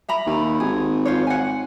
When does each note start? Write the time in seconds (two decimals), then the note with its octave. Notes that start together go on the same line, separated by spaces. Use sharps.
0.09 E5 A#5 B5
0.26 D#2
0.60 G#1 G#4
1.06 F4 C5 C#5
1.27 F#5 G#5